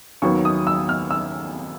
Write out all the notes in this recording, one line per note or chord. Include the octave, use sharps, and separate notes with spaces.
D#2 D#3 F#3 B3 C#6
D#6
E6
F6
E6